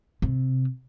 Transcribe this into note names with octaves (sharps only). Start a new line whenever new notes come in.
C3